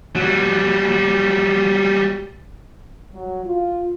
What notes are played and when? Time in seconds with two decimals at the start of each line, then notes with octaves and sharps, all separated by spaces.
0.16 F#3 G3
3.14 F#3
3.45 F4